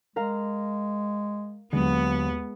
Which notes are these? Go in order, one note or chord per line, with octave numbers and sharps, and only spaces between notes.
G#3 A#4 F5 A#5
D#2 D3 F#3 G#3 B3